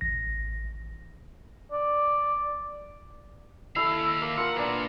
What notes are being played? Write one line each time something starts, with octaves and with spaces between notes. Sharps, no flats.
A1 A#6
D5
D#2 E4 A4 F5
A#3
F4 A#4 F#5
A#2 B3 D4